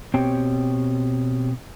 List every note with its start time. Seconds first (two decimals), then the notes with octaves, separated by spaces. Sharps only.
0.14 B2 C4 G4 C#5 G5